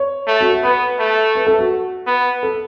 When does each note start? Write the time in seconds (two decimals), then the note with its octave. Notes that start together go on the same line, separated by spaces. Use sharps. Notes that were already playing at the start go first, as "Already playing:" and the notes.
Already playing: C#5
0.27 A3
0.41 F#4
0.51 A4
0.63 B3 B4
0.99 A3
1.35 B4
1.47 A4
1.59 F#4
2.07 B3
2.43 A4